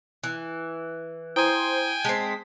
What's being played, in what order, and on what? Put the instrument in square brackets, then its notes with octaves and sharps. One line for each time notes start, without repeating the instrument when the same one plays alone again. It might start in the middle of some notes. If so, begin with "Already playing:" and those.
[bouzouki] E3
[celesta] E4 A#5 D#6 [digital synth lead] C5 [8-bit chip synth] G5 G#5
[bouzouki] G#3 C4 [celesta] A5 C7 [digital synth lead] B6